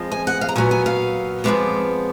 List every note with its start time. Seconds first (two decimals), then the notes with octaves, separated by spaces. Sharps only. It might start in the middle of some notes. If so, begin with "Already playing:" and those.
Already playing: F2 F3 G#3
0.12 G#5
0.27 F#5
0.41 F5
0.49 A#5
0.56 A#2 F#3 B3 G#5
0.71 G#5
0.86 F5
1.44 F2 F3 G#3 B3 D5